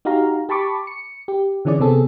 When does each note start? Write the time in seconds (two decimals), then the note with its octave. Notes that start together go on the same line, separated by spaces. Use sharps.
0.05 D#4 F#4 G4 F5 A#5
0.49 G4 A5 B5 C#6 D6
0.87 C#7
1.28 G4
1.65 D3 E3 C#4 G#4 D5
1.79 C3 B3 C4 G#4 A4